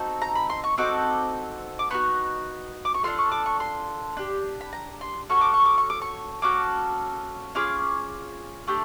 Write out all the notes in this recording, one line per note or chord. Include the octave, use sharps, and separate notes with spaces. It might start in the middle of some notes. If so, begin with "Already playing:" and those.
Already playing: C4 D#4 F#4 A4
A#5
B5
C6
C#6
C4 D#4 F#4 A4 D6
D6
B3 D#4 F#4 C#6
D6
C#6
D4 F4 A4 C6
C#6
D6
C#6
C6
D4 G4
B5
A#5
C6
C#4 F#4 A4 C#6
D6
C#6
D6
C#6
D6
C#6
A#3 C#4 F#4 A4 D6
C#4 F4 G#4 D6
A3 D4 G4